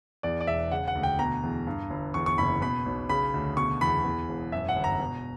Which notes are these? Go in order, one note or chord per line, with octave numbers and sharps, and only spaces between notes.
E2 D5
D5
E1 E5
C#3 F#5
F#5
D2
G5
B2 A#5
E2
G2
G1
E2 C#6
C#6
F#1 B5
B2 B5
B1
C#3 B5
D2
B2 C#6
E2 B5
E2
E1
F#2 E5
F#5
G1
A#5
B2